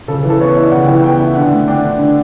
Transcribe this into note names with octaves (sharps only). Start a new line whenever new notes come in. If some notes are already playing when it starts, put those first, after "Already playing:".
C#3 A4
A4
E3
A4
B3 C#5
E4 D5
C#3 F#5
G5
E3 F#5
G5
B3 G5
E4
D3 F#5
A3
D4 G5
D3
D3